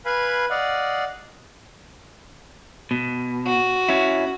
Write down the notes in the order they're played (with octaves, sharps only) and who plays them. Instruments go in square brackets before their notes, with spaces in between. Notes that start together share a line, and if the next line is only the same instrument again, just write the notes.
[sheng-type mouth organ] B4 F5 G#5 B5
D5 D#5 F5 F#5
[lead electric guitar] B2
[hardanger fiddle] F#4
[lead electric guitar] C#4 E4